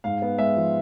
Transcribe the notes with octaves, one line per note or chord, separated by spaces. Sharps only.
G#2 F5
B3
G#3 E5
F3